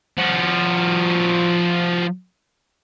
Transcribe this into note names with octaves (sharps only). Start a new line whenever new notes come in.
F3 F#4